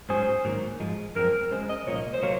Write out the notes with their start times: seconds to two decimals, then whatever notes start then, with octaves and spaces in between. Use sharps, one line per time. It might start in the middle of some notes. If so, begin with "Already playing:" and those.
0.09 G#2 F#3 C#4 G#4 C5
0.45 G#2 D#3 F#3 A#3
0.80 G#2 F3 G#3
1.15 F#2 F3 C4 A#4
1.51 C#2 C#3 G#3 C5
1.69 D#5
1.87 C2 A#2 F3 A#3 C#5
1.96 D#5
2.13 C5
2.22 C3 F#3 A#3 F4 C#5